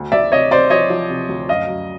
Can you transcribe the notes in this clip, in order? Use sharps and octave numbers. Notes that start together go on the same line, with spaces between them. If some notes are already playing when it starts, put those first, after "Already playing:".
Already playing: D2
D2 D5 E5
C3 C#5 D#5
C3 C5 D5
F3 C#5 D#5
F3
C3
D2
F#2 D#5 F5
F#2